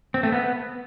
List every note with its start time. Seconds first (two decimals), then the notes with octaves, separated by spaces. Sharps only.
0.14 C4
0.23 A3
0.32 B3